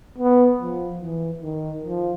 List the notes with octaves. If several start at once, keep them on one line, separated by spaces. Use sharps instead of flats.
B3
F3
E3
D#3
F3